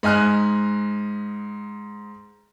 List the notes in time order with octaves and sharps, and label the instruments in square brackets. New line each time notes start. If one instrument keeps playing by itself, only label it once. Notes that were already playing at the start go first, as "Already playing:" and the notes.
[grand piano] G#2 D#5 G#5 F6 F#6